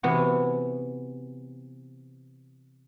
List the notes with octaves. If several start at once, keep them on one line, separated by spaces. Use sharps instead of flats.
C3 E3 B3 F#4